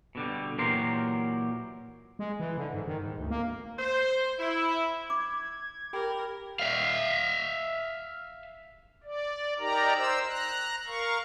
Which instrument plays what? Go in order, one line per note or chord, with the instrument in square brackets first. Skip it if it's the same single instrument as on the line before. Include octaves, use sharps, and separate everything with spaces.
[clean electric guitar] B2 D3 G3
A#2 E3 F#3 G4 A#4 C6
[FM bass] G#3
E3
D3
G#2
D#3
G#2
D2
A#3
[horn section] C5
E4
[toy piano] D6 [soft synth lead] G#6
[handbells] G4 G5 B5 [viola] A#4
[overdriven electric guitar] E5 F5
[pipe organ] D5
D#4 G4 A#4 D5 A#5
C5 E6
A#5 F#6
A#4 F5 C#6